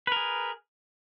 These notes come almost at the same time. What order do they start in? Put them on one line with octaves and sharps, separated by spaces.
B4 A#4 G#4